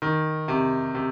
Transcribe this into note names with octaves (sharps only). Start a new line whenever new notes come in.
D#3
C3
C3